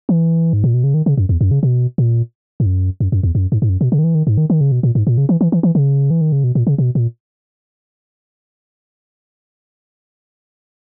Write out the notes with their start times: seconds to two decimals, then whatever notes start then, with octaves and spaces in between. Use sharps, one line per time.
0.09 E3
0.53 G#2
0.64 A#2
0.74 B2
0.84 C#3
0.94 D#3
1.06 C#3
1.17 F#2
1.29 E2
1.41 F#2
1.51 C#3
1.63 B2
1.98 A#2
2.60 G#2
2.66 F#2
3.00 F#2
3.12 F#2
3.23 E2
3.35 F#2
3.52 G#2
3.62 G#2
3.69 F#2
3.81 B2
3.92 C#3
3.99 D#3
4.04 E3
4.15 D#3
4.27 G#2
4.37 D#3
4.50 D#3
4.61 C#3
4.72 B2
4.83 A#2
4.95 G#2
5.07 A#2
5.18 C#3
5.29 E3
5.41 E3
5.52 E3
5.63 E3
5.75 C#3
6.10 E3
6.21 D#3
6.32 C#3
6.44 B2
6.55 A#2
6.67 C#3
6.78 B2
6.95 A#2